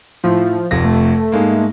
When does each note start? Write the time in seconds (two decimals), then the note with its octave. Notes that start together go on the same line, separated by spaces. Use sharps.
0.24 A2 F3
0.71 F1 F2 A#6
0.84 A3
1.32 G#2 G#3 A#3